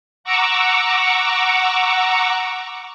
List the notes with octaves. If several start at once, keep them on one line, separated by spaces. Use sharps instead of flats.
F#5 A#5 C#6 D6 E6